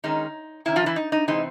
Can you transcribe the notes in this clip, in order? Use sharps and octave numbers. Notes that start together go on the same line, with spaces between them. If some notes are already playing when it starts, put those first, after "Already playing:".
D#3 G#3 C#4 D#4
C3 D#3 C#4 E4
F3 F4
E3 E4
D#4
D#4
C3 E3 G#3 C4 D#4